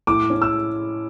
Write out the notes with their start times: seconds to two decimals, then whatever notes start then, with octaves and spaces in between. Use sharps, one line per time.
0.07 A2 D6
0.30 C#4
0.42 E6